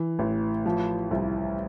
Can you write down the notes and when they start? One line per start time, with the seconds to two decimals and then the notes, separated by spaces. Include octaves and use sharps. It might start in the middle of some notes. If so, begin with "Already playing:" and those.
Already playing: E3
0.19 A1
0.66 F3
1.11 C2